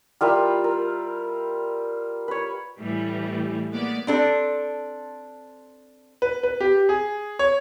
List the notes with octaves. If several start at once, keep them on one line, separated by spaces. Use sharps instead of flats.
G3 F4 A#4 E5
A#4
B4 C#5
A2 E3 G3
G#3 A#3 B3 D5
C4 D4 A4
B4
B4
G4
G#4
C#5